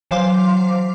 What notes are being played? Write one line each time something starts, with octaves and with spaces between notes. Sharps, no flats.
E3 F#3 C5 F5 C6 D6